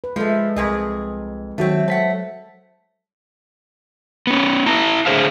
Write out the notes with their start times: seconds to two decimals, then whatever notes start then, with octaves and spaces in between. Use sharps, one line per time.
0.04 B4
0.16 F3 G#3 A3 A4
0.56 C2 F2 G#4 D#5
1.58 D#3 F#3 A3 C4 F#4 A4 C#5
1.88 A3 C5 F#5 B6
4.27 B3 C#4
4.66 E4 A5 A#5
5.06 A2 D3 G#4 C5 E5 F5